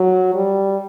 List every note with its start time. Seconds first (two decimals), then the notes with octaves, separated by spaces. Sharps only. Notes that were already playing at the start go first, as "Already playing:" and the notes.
Already playing: F#3
0.34 G3